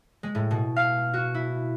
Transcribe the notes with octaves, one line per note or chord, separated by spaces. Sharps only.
G#3
A2
B2
F5
F#4
E4